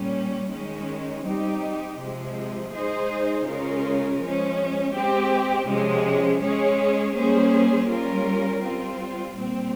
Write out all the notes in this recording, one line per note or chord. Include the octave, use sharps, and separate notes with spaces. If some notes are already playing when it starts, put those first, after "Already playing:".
Already playing: A#2 G3 C#4
D#3 G#3 C#4
G3 C4 D#4 G4
C3 F3 G#3
G#3 D#4 G#4 C5 D#5
C#3 G#3 C#4 F4 A#4
F3 G#3 C#4
G#3 C4 G4
C3 F3 G#3 C#4 G#4
G#3 C#4 G#4 C#5
G3 A#3 C#4 G#4 C5
G3 C#4 F4 A#4
G3 C4 F4
A#2 G3 C4